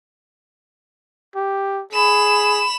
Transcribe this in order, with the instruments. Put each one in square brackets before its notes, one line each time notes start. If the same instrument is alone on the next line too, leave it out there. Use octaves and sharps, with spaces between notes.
[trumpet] G4
[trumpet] G#4 [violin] B5 E7